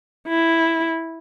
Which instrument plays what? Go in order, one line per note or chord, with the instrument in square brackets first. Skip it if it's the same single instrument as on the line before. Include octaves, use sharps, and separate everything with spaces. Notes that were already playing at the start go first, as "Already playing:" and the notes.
[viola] E4